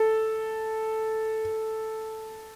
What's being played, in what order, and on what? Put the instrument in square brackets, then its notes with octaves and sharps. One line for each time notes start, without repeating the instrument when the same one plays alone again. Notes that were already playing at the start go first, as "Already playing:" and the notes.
Already playing: [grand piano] A4